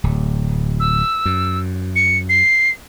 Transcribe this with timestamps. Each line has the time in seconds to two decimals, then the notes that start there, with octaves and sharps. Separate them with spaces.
0.04 D1
0.80 E6
1.25 F#2
1.96 C#7
2.29 C7